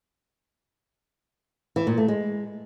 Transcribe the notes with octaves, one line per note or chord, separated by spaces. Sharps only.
E3
A#2
A3
G#3